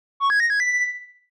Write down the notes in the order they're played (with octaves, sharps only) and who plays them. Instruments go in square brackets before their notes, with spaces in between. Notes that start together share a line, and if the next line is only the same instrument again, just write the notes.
[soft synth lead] C#6
G#6
A#6
G#6
B6